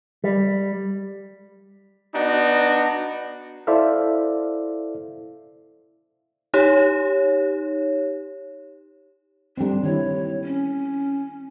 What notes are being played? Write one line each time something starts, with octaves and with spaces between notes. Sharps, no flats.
G3
B3 D4 D#4 F#4
E4 A4 C5 D5 E5 F5
D#4 G4 C#5
G3 C4 D4
D#3 E4 C#5
C#4